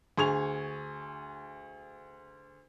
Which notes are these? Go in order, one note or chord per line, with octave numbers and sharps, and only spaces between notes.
D2 G#4 C#6 G#6 F7